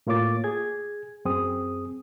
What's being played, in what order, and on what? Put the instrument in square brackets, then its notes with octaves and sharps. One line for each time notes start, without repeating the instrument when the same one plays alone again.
[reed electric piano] A2 A#3 F4 C#5 D6 A6
G#4 G#6
F#2 C4 G#4 D#6